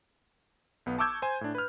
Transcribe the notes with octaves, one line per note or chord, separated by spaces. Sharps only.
B1 B3
A5 C#6 D6 E6 G6 G#6
C5 G#5
A2 D4
B4 F6